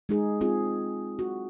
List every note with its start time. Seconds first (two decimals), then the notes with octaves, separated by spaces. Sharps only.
0.09 G#3 D#4 G#4
0.41 C4 F4 G#4
1.19 F#4